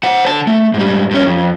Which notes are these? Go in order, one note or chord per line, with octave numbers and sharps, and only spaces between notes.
C5 F#5
D3 A5
A3
G#2 G3
G2 C#4
F2